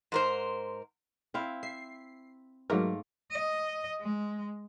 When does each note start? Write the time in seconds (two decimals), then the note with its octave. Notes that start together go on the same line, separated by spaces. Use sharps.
0.12 G#2 A#4 C5
1.34 C4 E4 F5
1.63 E5 C7
2.70 G#2 F#3 A3 A#3 A#4
3.31 D#5
4.01 G#3